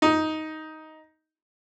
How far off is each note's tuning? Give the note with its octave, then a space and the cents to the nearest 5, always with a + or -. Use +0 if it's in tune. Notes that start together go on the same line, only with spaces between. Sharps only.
D#4 +10